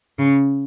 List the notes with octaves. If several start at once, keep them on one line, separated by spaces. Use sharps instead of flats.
C#3